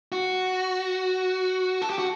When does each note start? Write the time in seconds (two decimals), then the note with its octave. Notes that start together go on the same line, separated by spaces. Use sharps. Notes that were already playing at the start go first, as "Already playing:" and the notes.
0.12 F#4
1.82 A4
1.90 G4
1.98 F#4